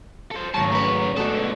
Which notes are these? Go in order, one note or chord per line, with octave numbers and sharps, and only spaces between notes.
A4 C5
G#1 C#3 F#3 A3 A5 C#6
A3 B4 A#5
G#3 A3 B3 D4 F#4 A4
B2 D3